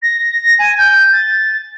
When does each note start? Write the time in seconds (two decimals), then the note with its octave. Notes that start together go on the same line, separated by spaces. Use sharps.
0.02 A#6
0.58 G#5
0.78 G6
1.12 A6